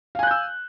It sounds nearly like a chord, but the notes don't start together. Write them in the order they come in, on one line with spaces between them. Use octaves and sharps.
F5 G#5 F#6 G6 E6